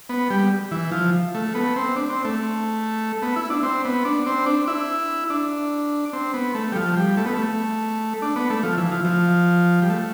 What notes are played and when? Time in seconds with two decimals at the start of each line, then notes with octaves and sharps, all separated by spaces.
0.09 B3
0.30 G3
0.71 E3
0.92 F3
1.35 A3
1.55 B3
1.76 C4
1.96 D4
2.10 C4
2.24 A3
3.22 B3
3.36 E4
3.50 D4
3.63 C4
3.85 B3
4.05 D4
4.26 C4
4.46 D4
4.68 E4
5.30 D4
6.13 C4
6.34 B3
6.55 A3
6.72 G3
6.76 F3
6.97 G3
7.17 A3
7.26 B3
7.34 A3
8.22 D4
8.36 B3
8.50 A3
8.63 F3
8.77 E3
8.91 F3
9.05 F3
9.82 G3
9.89 A3